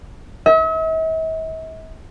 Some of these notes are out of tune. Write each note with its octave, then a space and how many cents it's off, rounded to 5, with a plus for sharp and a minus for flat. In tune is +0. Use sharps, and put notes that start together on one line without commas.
E5 -45